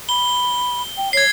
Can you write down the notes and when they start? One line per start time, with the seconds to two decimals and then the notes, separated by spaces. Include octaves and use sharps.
0.09 B5 G7
0.97 G5
1.13 C#5 G#6 C7